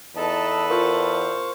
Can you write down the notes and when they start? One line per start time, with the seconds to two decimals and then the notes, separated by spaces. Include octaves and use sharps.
0.16 E2 D#4 A4 B4 D#5 A5
0.70 F4 A#4 C5 F5 C#6